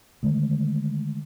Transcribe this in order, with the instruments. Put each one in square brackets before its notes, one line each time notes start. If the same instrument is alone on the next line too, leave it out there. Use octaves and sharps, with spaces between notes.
[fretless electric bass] D3 D#3 G#3 A3